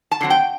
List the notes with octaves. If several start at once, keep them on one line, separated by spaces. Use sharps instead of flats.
A5
D3 F#3 C4
G5